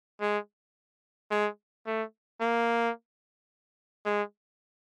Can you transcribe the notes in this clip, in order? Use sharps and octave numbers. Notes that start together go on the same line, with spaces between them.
G#3
G#3
A3
A#3
G#3